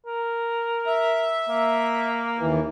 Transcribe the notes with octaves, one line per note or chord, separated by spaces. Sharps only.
A#4
E5
A#3
D#2 E3